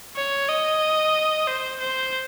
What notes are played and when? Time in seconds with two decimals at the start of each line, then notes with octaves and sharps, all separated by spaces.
0.16 C#5
0.49 D#5
1.48 C5
1.80 C5